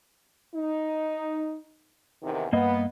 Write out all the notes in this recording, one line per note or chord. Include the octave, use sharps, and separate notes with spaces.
D#4
E2 C3 D#3
G2 A#3 B3 D#5